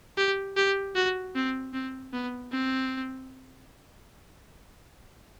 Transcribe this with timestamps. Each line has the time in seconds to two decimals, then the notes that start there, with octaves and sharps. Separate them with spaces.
0.17 G4
0.57 G4
0.96 F#4
1.35 C4
1.73 C4
2.13 B3
2.52 C4